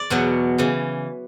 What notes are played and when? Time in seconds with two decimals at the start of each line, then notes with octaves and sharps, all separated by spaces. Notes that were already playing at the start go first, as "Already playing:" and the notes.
Already playing: D5
0.10 E2 B2 F#3
0.58 C#3 E3